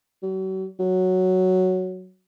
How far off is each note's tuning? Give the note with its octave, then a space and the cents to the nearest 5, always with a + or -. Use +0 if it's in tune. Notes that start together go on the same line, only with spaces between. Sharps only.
F#3 +40
F#3 +0